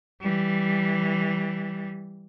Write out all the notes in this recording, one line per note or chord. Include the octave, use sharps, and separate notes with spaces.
E3 G3